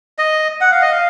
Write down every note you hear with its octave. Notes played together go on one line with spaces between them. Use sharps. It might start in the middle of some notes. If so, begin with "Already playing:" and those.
D#5
F#5
F5
D#5
F5